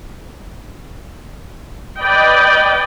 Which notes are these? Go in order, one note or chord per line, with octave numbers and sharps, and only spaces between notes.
B4 D5 D#5 G5